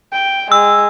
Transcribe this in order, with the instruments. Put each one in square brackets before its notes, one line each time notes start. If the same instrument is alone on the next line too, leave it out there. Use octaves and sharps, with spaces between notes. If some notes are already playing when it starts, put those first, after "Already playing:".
[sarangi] G5
[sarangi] G#3 [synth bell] E6